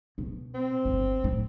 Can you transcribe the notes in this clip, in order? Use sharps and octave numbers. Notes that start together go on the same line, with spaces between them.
B2
C4
G1
A2